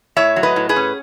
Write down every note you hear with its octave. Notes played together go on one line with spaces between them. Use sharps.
A2 C#5 E5
F#3
B4 D#5
A2
G#4 B4
C#4